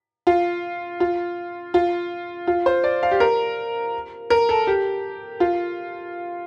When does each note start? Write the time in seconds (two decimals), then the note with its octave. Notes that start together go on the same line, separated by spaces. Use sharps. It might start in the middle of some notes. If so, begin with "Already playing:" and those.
0.27 F4
1.00 F4
1.74 F4
2.47 F4
2.66 C5
2.84 D5
3.03 F5
3.11 G4
3.20 A#4
4.30 A#4
4.49 A4
4.67 G4
5.40 F4